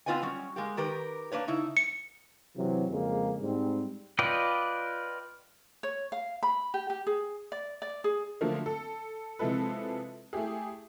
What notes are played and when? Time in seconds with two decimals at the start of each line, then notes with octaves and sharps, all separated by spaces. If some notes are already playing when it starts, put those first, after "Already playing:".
0.06 B3 C4 F4 B4 D#5 G#5
0.22 F#3 G3 C#4
0.56 G#3 A#3 G4
0.77 D#3 G4 A#4 B4
1.32 A#3 D4 B4 C#5
1.48 C#3 D#4 E4
1.77 C#7
2.56 C3 E3 F#3
2.90 F2 C#3 G#3 A#3
3.41 G#2 G3 C4
4.19 F4 B4 D5 D#5 G5
5.83 C#5
6.12 F5
6.43 B5
6.74 G4
6.90 G4
7.07 G#4
7.52 D5
7.82 D5
8.04 G#4
8.41 D3 F3 F#3 A3 A#3
8.66 A4
9.39 C3 F3 G#3 E4 A4 B4
10.33 A3 E4 G4 G#4